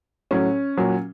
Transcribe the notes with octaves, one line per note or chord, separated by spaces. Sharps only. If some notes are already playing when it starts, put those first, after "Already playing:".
A2 F#3 C#4
A#2 F#3